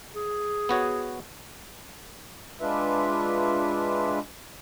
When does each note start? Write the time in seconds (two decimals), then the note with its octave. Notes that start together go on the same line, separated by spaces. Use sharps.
0.15 G#4
0.69 B3 F#4 C#5
2.61 G#3 D4 F4 B4 E5